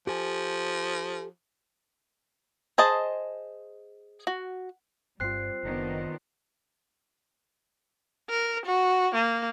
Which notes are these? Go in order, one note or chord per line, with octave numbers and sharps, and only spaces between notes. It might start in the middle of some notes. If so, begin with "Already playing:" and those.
F3 G4 A4 G#5
G#4 C5 D#5 A5
F#4
G1 G2 G3 C4 F4 F#6 C7
F#1 D#3 B3 D4
A#4
F#4
A#3